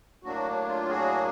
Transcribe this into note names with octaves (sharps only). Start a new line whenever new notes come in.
A2 F#3 A#3 D4 F#4
F4
F#4 G#4